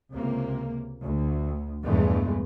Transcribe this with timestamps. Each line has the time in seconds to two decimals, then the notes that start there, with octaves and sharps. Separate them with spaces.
0.12 C#2 C3 A#3
1.03 D2
1.84 A#1 E2 G2 E3 G#3 A3